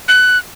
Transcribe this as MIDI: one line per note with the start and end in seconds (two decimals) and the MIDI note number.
0.08 0.38 90